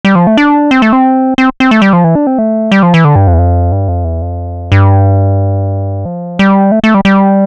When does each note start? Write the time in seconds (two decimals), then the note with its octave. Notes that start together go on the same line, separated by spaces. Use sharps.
0.05 G3
0.15 F3
0.27 A3
0.37 D4
0.71 C4
0.82 A3
0.93 C4
1.38 C4
1.60 C4
1.71 A3
1.82 G3
1.93 F3
2.04 E3
2.15 D4
2.27 C4
2.38 A3
2.72 G3
2.83 F3
2.94 E3
3.05 D3
3.16 G2
3.28 F2
3.33 E2
3.38 F2
3.72 G2
3.88 F2
4.04 E2
4.22 F2
4.72 G2
6.05 F3
6.39 G3
6.72 A3
6.84 A3
6.94 G3
7.05 G3